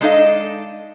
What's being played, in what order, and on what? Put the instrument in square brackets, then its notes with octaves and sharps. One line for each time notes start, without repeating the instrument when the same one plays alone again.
[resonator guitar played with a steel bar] G#3 D4 D#4 A4 D#5 F5